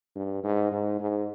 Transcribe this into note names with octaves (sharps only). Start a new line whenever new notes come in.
G2
G#2
G#2
G#2